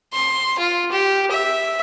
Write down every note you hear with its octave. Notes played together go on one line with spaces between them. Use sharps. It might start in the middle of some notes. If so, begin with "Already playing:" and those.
C6
F4
G4
E5